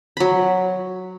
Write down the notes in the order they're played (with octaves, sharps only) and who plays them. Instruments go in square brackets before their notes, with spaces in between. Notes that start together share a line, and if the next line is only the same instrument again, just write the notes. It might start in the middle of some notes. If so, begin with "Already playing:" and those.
[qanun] F#3 B5